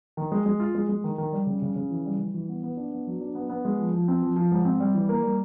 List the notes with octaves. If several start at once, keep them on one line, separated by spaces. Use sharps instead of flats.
D#3
G#3
G#3
F4
G#3
G#3
D#3
D#3
G3
C#3
C#3
C#3
E3
G3
G3
E3
B3
B3
D4
B3
F#3
D4
B3
B3
G#3
F3
F3
C4
F3
F3
G#2
C4
G3
E3
A#3
G3